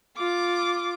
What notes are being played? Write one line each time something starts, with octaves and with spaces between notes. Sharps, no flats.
F4 D6